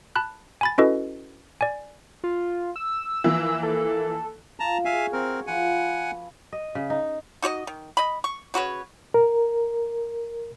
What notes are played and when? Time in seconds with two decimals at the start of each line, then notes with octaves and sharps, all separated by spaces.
0.16 A5 B5 F#6
0.61 G#5 B5 A6
0.78 C#4 E4 F#4 A4 B4 D#5
1.61 D5 G#5
2.24 F4
2.76 E6
3.24 E3 F3 A#3
3.63 A4
4.60 F4 A5 A#5
4.85 F#4 G#4 E5 F5 G#5
5.13 C4 A#4 C#6
5.47 F3 B4 F#5 G#5
6.53 D#5
6.75 C#3
6.90 D#4
7.42 D#4 F#4 C#5 D#5
7.67 D#3
7.97 D#5 B5
8.24 C#6
8.54 C#3 F#4 B4 C#5
9.14 A#4